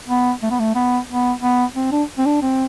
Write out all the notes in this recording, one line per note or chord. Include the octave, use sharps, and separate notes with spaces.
B3
A3
B3
A3
B3
B3
B3
C4
D4
C4
D4
C4